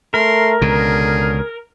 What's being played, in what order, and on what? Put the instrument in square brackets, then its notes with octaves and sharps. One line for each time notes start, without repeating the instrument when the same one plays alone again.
[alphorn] A3 [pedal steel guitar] A#4 [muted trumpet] C6
[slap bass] C#2 B2 [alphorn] D3 [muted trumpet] G#4